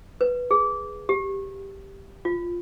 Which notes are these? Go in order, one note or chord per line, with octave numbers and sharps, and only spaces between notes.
B4
G#4
G4
F4